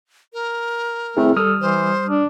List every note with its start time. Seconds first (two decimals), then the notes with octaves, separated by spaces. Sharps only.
0.33 A#4
1.17 A3 C4 E4 G#4
1.36 G3 A4 D#6 F6
1.61 E3 C5
2.08 D4